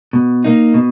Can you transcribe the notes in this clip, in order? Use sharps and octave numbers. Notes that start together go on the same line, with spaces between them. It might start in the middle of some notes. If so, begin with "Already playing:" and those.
B2
A#3 D#4
B2